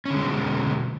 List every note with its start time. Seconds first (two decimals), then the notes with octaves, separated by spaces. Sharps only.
0.06 C#4
0.10 D3
0.15 G#3
0.19 C4
0.24 B2